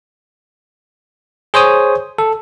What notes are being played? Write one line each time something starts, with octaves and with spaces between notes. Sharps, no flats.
G#4 C5 C#5 D#6
A4